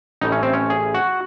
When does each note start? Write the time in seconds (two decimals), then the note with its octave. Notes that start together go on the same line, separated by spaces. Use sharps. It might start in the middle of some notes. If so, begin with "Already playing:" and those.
0.21 A1 A2 E3 D#4
0.32 C#4
0.43 C4
0.53 C#4
0.70 G#4
0.94 F#4